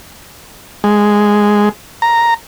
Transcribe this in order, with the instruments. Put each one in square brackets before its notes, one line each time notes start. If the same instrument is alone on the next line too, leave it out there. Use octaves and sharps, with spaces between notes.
[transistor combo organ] G#3
A#5